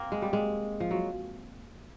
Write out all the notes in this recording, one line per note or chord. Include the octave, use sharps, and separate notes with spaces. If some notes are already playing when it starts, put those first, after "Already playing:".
Already playing: A#3 C4
G#3
G3
G#3
F3
F#3